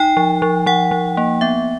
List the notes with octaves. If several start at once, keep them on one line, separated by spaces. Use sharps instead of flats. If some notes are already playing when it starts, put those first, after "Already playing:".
Already playing: D#4 G5
F3
F3
F3 F#5
F3
A#3
B3 E5